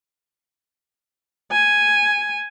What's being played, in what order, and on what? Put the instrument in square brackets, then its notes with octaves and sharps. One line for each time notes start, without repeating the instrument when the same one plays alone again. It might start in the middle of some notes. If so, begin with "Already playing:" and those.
[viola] G#5